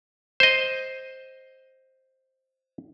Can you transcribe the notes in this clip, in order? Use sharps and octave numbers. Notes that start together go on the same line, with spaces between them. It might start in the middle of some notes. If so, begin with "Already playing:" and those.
C5 D#5